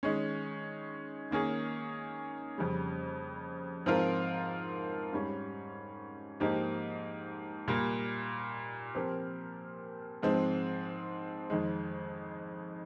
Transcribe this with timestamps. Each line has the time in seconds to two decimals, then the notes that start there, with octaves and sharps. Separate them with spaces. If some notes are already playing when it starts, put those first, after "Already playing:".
0.03 D#3 G#3 C#4
1.31 D#3 A#3 C#4 G#4
2.58 F2 C#3 G3
3.86 G#2 F3 C4 F4 A#4
5.13 G#2 G3 C#4
6.40 G#2 F3 A#3 D#4 G4
7.68 A#2 G3 A#3
8.95 F3 C4 G4 A#4
10.23 G#2 F3 G#3 C4
11.50 F2 D#3 G#3